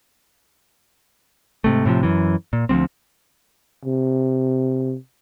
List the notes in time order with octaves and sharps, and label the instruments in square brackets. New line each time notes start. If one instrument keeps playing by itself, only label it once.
[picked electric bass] G#2 C3 A3
A2 C3 D#3 F3
F#2 E3
A#2
D2 F3 G3 C4
[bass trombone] C3